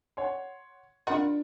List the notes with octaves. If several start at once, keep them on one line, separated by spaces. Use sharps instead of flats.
C#5 F#5 C6
D4 F4 A#4 F#5 B5